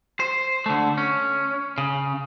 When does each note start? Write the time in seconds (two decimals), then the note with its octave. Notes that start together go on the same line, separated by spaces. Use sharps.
0.20 C5
0.66 D3 A3
0.98 C#4
1.78 C#3